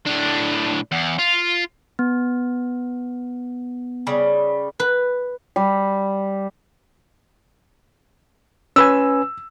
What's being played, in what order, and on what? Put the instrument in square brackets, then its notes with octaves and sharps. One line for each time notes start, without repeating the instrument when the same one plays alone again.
[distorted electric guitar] A2 D4
E2
F4
[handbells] B3
[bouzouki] C#3 G3
[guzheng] B4
[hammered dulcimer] G3
[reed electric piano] C#4 B4 G#5 [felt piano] E6